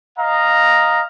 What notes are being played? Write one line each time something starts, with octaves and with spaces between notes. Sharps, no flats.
D#5 F5 A#5